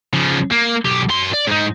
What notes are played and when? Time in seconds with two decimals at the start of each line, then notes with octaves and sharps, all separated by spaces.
0.13 C#3 F3
0.52 A#3
0.85 B1 G4
1.09 F#2 C6
1.33 D5
1.47 G#2 D#4